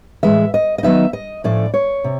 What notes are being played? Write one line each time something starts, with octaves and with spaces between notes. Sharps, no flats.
A2 E3 G#3 E5
D#5
D#5
D#3 F#3 B3 D#4 E5
D#5
A2 F3 A3 C#4 D5
C#5
C3